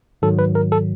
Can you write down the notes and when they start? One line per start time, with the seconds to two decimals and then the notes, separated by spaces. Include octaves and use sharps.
0.22 G#2 D#3 F#3 A4
0.39 B4
0.55 A#4
0.72 A4